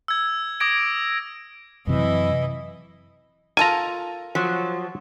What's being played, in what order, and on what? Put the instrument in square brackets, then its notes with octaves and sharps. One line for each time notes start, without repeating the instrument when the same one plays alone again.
[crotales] E6 G#6
D6 D#6 G#6 A#6 D7
[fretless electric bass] F#2 C3 F#3 [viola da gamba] E3 E4 D#5
[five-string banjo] F4 A4 A#4 [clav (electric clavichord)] G#5 A#5
[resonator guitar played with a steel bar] F3 F#3